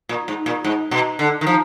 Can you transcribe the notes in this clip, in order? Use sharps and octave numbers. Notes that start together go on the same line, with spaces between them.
A#2
G#2
A#2
G#2
B2
D3
D#3
F3